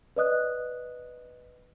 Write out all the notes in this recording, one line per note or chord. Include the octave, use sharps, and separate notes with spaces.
B4 D5 D#5 D#6 F#6